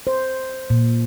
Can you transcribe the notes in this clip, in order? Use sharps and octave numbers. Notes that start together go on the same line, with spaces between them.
C5
A#2